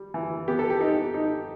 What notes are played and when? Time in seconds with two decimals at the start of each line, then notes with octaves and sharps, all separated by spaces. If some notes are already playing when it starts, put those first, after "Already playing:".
Already playing: G3
0.14 E3
0.48 B3 G4
0.59 A4
0.70 G4
0.81 D#4
1.14 D#4